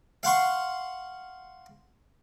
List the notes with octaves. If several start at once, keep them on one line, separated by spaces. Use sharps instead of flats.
F5 F#5 C6 C#6